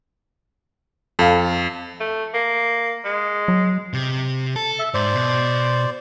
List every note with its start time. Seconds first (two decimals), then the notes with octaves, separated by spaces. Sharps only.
1.19 F2 A4 F5
2.00 A3
2.34 A#3
3.04 G#3
3.48 F#3
3.93 C3
4.56 A4 A5
4.79 E5
4.94 G#2 C5 D5
5.14 B2